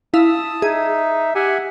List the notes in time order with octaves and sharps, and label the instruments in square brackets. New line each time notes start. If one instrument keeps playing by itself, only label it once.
[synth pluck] E4 F5 [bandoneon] A5 D#6
[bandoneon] D#4 [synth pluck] G#4 [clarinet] E5
[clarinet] G4 [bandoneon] E5 F#5 G#5